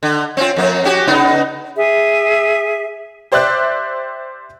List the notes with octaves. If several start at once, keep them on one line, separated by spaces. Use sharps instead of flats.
D3
C4 C#4 F4
F2 A#3
C#4 F#4 G4
C#3 B3 D#4
G#4 E5
G4 C5 D5 E5 F#6